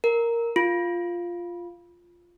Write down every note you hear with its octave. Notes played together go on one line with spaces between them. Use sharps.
A#4
F4